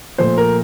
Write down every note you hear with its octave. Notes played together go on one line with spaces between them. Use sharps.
A#2 F3 A3 C5
A#4